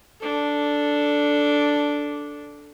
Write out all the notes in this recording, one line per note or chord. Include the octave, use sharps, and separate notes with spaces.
D4 A4